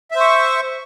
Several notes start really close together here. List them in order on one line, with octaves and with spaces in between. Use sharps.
E5 C5 C#6